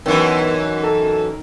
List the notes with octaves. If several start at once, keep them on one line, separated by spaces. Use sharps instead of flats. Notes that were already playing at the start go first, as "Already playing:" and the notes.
F#2 D#3 E3 B3
A4 A#4